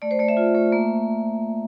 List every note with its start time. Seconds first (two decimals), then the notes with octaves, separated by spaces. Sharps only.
0.02 A3 D5
0.11 C5
0.19 A3 D5
0.28 E5
0.37 F4
0.55 A3
0.72 A#3